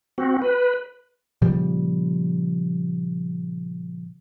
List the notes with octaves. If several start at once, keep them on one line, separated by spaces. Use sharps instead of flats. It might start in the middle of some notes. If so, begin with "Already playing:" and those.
C4 F#4
B4
A#2 C#3 F3 G3